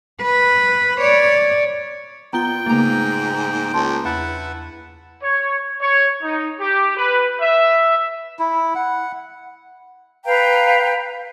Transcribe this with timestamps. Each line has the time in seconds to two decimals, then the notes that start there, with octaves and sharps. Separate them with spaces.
0.22 B4
1.01 C#5 D5
2.33 A#2 B3 F4 G5 A#5 G7
2.66 G#2 C#3 A3 A#3 A#5
3.74 C#2 A5 C6
4.05 E2 E4 B4 F#5 A5
5.21 C#5
5.80 C#5
6.23 D#4
6.59 G4
6.96 B4
7.40 E5
8.39 E4
8.75 F#5
10.25 B4 F5 G5 A#5